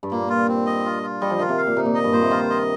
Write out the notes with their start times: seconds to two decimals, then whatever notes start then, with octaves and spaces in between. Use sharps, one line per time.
0.03 G2
0.11 A#2 A#3
0.29 F4
0.48 C4
0.66 D#5
0.85 F4
1.03 F4
1.21 G3 D#5
1.30 F3
1.39 D#3 F4
1.49 C3
1.58 F5
1.67 A#2
1.77 C3 D#4
1.86 A#2
1.95 D#5
2.04 G2
2.13 A#2 C5
2.23 C3
2.31 D#3 F4
2.50 D#5